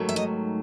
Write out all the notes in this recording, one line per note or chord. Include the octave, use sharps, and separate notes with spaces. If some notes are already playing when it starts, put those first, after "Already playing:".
Already playing: G#2 D#3 F#3 A3
E5
D#5